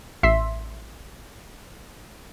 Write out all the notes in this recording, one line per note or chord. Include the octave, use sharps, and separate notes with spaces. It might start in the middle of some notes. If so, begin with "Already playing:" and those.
A1 E5 C6 B6